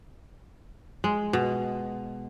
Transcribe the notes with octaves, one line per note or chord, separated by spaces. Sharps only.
G#3
B2